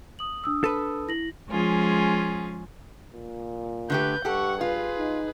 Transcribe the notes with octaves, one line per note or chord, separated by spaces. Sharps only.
D#6 F#7
D4 D#6 E6
A4 B4
E4 A#6 F#7
F3 G#3 C#4 F4 G#4
A#2
D3 A3 G4 B4 G6
G2 G4 A4 F#5 C#6
F4 G#4 B4
D#4